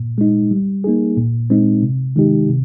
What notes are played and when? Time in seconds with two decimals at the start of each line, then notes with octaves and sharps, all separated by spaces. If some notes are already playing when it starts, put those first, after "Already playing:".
Already playing: A#2
0.18 G#3 D#4
0.51 G3
0.84 A#3 D#4 G#4
1.17 A#2
1.50 G#3 C4 D#4
1.82 C3
2.16 D#3 G#3 D#4 G4
2.49 C3